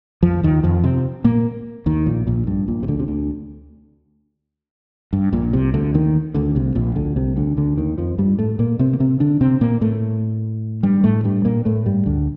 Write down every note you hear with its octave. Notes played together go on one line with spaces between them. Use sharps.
F2 F3
D#2 D#3
F2 F3
C3 C4
A#2 A#3
D#2 D#3
A#1 A#2
A#1 A#2
G2
A#1 A#2
C3
D2 D3
C3
D2 D3
G2
A#1 A#2
C2 C3
D2 D3
D#2 D#3
D2 D3
C2 C3
A#1 A#2
D2 D3
C2 C3
D2 D3
D2 D3
D#2 D#3
F2 F3
G2 G3
A2 A3
A#2 A#3
C3 C4
A#3
C3 C4
D3 D4
C3 C4
A#2 A#3
A2 A3
G2 G3
A2 A3
G2 G3
A#2 A#3
A2 A3
G2 G3
D2 D3